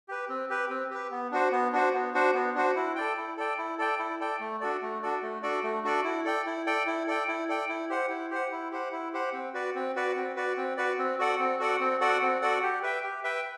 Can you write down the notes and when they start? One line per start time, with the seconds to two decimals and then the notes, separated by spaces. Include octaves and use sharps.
0.08 G4 B4
0.29 C4
0.49 G4 B4
0.70 C4
0.91 G4 B4
1.11 B3
1.31 D4 F#4 C5
1.52 B3
1.73 D4 F#4 C5
1.93 B3
2.14 D4 F#4 C5
2.34 B3
2.55 D4 F#4 C5
2.76 E4
2.96 A4 D5 G5
3.17 E4
3.37 A4 D5 G5
3.58 E4
3.78 A4 D5 G5
3.99 E4
4.20 A4 D5 G5
4.40 A3
4.61 D4 F#4 A4 D5
4.82 A3
5.02 D4 F#4 A4 D5
5.22 A3
5.43 D4 F#4 A4 D5
5.63 A3
5.84 D4 F#4 A4 D5
6.04 E4
6.25 A4 D5 G5
6.46 E4
6.66 A4 D5 G5
6.87 E4
7.07 A4 D5 G5
7.28 E4
7.49 A4 D5 G5
7.69 E4
7.89 G4 C5 F#5
8.10 E4
8.30 G4 C5 F#5
8.52 E4
8.71 G4 C5 F#5
8.92 E4
9.13 G4 C5 F#5
9.33 C4
9.54 F#4 B4 D5
9.75 C4
9.96 F#4 B4 D5
10.16 C4
10.36 F#4 B4 D5
10.57 C4
10.77 F#4 B4 D5
10.99 C4
11.19 F#4 A4 D5 F#5
11.39 C4
11.59 F#4 A4 D5 F#5
11.80 C4
12.01 F#4 A4 D5 F#5
12.22 C4
12.42 F#4 A4 D5 F#5
12.63 G4
12.83 B4 E5 G5
13.04 G4
13.24 B4 E5 G5